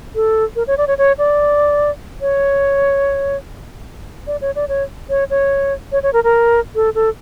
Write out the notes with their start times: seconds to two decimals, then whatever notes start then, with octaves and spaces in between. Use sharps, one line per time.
0.15 A4
0.56 A#4
0.67 C#5
0.78 D5
0.88 C#5
0.98 C#5
1.18 D5
2.21 C#5
4.27 D5
4.41 C#5
4.56 D5
4.68 C#5
5.10 C#5
5.30 C#5
5.92 C#5
6.03 C#5
6.13 A#4
6.24 A#4
6.75 A4
6.95 A4